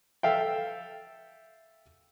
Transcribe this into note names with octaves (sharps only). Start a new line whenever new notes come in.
A4 E5 F5 G5